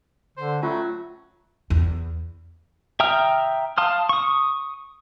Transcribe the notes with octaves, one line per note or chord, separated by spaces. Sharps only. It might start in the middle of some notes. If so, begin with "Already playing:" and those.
D3 C5
F#3 A3 C#4 F4 A5
E2
E5 G5 A#5 D#6 F6
F5 A5 C6 D#6 F6
C#6 D#6